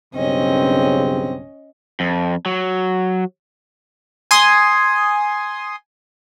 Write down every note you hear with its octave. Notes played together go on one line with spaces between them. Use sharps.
B1 G2 C#3 C4 C#4 D#5
F2
F#3
G#5 C6 D#6